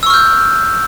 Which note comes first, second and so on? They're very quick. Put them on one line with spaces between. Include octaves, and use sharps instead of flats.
E6 C#6 F6 G6